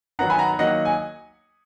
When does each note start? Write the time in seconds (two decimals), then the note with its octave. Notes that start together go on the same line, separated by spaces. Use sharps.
0.19 D#3 F#3 B3 D#4 F#5 A#5
0.30 G#5 B5
0.39 F#5 A#5
0.59 D#3 F#3 A#3 D#5 F#5
0.85 G#5